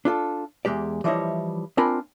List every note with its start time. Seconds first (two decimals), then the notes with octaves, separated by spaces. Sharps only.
0.05 D4 F4 G#4 A4
0.65 E2 G#3 G4 D5
1.04 E3 F3 G3 E4 C#5 D#5
1.77 C4 D4 F4 A#4 G#5 B5